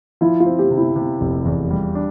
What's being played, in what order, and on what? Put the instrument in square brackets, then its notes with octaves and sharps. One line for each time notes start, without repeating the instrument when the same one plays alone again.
[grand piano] F3 [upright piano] E4
[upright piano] F4
[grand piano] C4
[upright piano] G4
[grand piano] C3
[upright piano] E4
[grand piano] C3
F1
E2
G3
D4